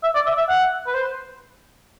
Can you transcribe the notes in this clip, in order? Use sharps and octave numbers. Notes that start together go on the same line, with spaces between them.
E5
D5
E5
E5
F#5
B4
C5